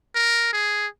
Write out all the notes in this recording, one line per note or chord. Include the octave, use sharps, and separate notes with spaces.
A#4
G#4